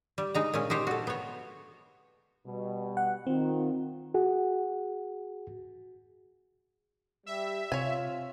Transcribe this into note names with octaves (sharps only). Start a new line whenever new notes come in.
G3
G#3 D#4 A#5
A#2 G#3 C#4
D#4 G4 C5 C#5
F#4 A4
B3 C#5
B2 G3
F#5
D#3 C4 F4
F#4 G#4 F#5
G3 E5
C3 F4 C#5 G#5